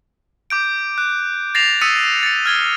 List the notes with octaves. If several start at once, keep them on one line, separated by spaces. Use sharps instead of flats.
D6 G6 D7
F#6
A6 A#6 C7 E7 F7
D#6 E6 A6 B6 C#7 D#7
A6 C#7
F6 G#6 G7